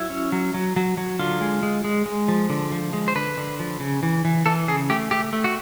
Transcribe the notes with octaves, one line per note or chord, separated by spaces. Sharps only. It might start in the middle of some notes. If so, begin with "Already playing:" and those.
Already playing: F#3 E4
C#4
F#3
F#3
F#3
F#3
D3 F4
G#3
G#3
G#3
G#3
F3
D3
F3
G#3
C5
D3 B4
D3
F3
C#3
E3
E3
E3 A4
C#3 G#4
A3 G4
A3 G4
A3
F#4